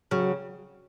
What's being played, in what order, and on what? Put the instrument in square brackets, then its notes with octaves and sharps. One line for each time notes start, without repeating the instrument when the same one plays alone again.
[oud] C#3 [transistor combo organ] F#3